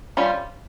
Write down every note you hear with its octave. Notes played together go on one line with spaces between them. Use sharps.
G3 C#4 F4 C5